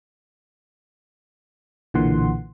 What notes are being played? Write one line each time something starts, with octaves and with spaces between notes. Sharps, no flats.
B1 A#2 D3 E3 F#5 C6